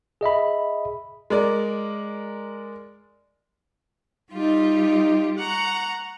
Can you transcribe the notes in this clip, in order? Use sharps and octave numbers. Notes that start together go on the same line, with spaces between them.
G#4 D#5 E5 B5
G#3 A#4 D5
G3 D#4 F4 G4
F#5 A#5 C#6